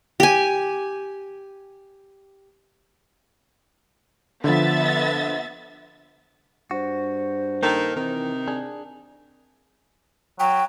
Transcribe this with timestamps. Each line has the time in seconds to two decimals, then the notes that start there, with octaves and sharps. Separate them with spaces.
0.20 G4 G#5
4.44 D3 F3 B3 E5 A6
6.71 G2 F#4 C5
7.63 D#3 A#3 A4 A#4
7.96 C3 D#3 E3
8.48 D4 G#4
10.39 F#3 G5